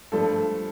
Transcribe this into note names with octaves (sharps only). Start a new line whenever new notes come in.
G2 F3 A3 A4